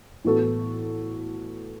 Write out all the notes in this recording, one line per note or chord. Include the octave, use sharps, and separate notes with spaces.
A2 E3 B3 F#4 A4